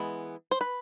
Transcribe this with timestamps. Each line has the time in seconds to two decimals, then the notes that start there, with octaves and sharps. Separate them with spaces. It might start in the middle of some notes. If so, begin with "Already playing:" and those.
Already playing: E3 G#3 B3
0.51 C5
0.61 B4